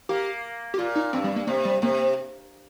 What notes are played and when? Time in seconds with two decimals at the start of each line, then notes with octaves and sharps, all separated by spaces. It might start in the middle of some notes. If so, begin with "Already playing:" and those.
0.09 A#3 G4
0.74 G4
0.78 A#2 F4
0.96 D#4
1.13 G2 C4
1.24 G3
1.36 A#3
1.47 C3 A#3
1.65 G3
1.82 C3 A#3